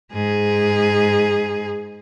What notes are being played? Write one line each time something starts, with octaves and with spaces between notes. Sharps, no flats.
G#2 G#4